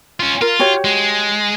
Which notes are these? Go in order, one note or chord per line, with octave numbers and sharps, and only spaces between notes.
C#4 F4
F4 A#4
F#4 G4 C#5
G#3